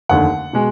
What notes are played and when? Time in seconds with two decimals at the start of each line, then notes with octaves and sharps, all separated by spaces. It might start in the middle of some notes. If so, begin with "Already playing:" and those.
0.09 F1 D#2 D3 F#5
0.53 B2 G#3